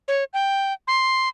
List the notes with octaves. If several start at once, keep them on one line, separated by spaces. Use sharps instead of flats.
C#5
G5
C6